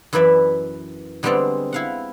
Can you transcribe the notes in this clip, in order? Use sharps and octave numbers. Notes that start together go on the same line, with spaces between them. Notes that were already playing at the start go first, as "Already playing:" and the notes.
F#2 E3 E4 B4 D5 E5
D3 G3 G#3 B3 C4 D5
E4 F5 F#5